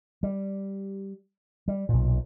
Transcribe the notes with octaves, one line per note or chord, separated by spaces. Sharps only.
G3
G3
B1 A#2